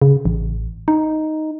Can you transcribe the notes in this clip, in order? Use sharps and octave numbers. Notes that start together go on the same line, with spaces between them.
C#3
A1
D#4